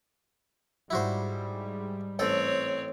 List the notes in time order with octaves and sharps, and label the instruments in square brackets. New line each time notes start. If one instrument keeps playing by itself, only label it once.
[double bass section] G#2 G3 [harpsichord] E4 F#4 C5
[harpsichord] A1 A4 G5 [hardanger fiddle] C4 C#5